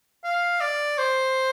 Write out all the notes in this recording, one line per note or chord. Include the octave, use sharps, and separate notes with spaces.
F5
D5
C5